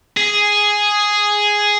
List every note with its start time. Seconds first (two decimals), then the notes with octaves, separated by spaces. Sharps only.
0.17 G#4